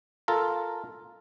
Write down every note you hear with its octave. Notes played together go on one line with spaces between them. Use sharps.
F4 A4 A#4